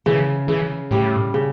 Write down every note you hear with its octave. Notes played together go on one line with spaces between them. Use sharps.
C#3 E3
C#3 E3
A2 G3
C#3